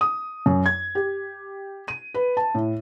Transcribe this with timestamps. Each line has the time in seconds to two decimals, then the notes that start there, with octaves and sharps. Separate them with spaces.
0.01 D#6
0.46 F#2
0.66 G#6
0.95 G4
1.88 D#7
2.14 B4
2.37 A5
2.55 A2